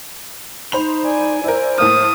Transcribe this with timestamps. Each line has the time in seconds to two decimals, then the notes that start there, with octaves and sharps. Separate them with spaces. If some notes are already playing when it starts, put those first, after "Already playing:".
0.72 D#4 C5 B5 F7
1.04 D5 G#5
1.44 E4 A#4 C5
1.78 A2 A#3 A5 D#6 F6